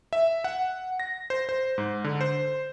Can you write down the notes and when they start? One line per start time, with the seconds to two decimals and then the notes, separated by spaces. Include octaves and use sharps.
0.13 E5
0.44 F#5
1.00 A#6
1.30 C5
1.49 C5
1.78 G#2
2.04 D3
2.21 C5